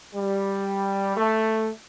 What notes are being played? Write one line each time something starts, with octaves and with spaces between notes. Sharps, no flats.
G3
A3